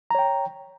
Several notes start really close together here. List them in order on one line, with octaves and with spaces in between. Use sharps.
A#5 C#5 G5